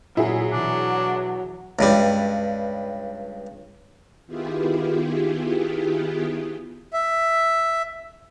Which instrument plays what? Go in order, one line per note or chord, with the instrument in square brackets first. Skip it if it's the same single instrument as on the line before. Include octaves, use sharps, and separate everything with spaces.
[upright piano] A#2 [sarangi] F#3 [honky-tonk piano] E4 G#4
[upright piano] B2 E3 [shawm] D4
[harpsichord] C#2 G2 G3
[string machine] D#3 B3 E4 F4 G4 G#4
[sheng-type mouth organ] E5